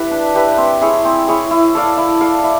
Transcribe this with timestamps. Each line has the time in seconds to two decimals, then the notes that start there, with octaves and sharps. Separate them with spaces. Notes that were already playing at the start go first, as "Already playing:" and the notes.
Already playing: E4 G4 B4 E5
0.11 D4
0.35 G4 B4 E5
0.57 C4
0.81 E4 G#4 C#5
1.05 C4
1.28 E4 G#4 C#5
1.51 E4
1.75 A4 D5 F5
1.97 E4
2.21 A4 D5 F5
2.44 E4